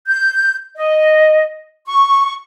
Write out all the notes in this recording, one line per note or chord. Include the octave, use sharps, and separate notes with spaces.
G6
D#5
C#6